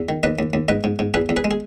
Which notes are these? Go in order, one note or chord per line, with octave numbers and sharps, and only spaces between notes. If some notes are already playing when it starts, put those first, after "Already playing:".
Already playing: E2
D#3
D#2 B4 D#5
D#2
D#2
G#2 B4 D#5
G#2
G#2
E2 G#4 B4
E2
G#4 B4
G#3
G#4